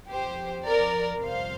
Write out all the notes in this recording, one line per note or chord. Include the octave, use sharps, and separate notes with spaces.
F2 F3 G4 C5
A#4 D5
G1 F2 C3 C5 F5